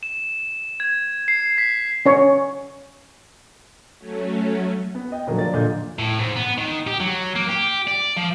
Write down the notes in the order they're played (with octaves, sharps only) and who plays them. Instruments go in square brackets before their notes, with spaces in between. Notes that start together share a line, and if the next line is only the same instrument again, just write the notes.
[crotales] E7
G#6
C7
B6
[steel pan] C#4 C#5
[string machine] F#3 A3 C#4
[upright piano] B3
D#5 G5
A#2 D3 F3 F#3 A#3
F3 D5 A6
A#2 D3 D#5 G6
[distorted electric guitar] A2
G#2
B3
D#3
G4
F#3
A#3
G4
D5
F3